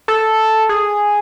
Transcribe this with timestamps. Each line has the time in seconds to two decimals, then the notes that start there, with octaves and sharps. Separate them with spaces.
0.08 A4
0.69 G#4